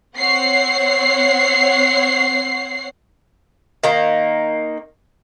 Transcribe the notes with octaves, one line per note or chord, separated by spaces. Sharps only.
C4 C#5 F#5 C7
D#3 A#3